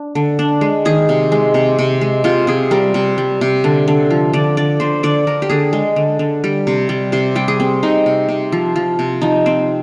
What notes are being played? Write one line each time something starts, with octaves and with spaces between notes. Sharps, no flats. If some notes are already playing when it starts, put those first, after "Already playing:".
Already playing: D4
D3
D4
G#3
D#3 G#4
C3
G#3
C3
C3
G#3
C3 F4
C3 G#4
G3 A#4
C3
G3
C3
D3
D3
F3
D3 D5
D3 D5
D3 C5
D3 D5
D3 A#4
G4
D3 G#4
G#3
D3
D3
G3
C3
G3
C3 C5
G3 G4
G#4
C4
C3 D#4
C3
C3
F3
F3
C3
F3 D#4
C4